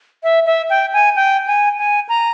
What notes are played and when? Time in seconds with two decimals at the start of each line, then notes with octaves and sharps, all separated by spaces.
0.23 E5
0.46 E5
0.70 G5
0.93 G#5
1.16 G5
1.47 G#5
1.78 G#5
2.09 A#5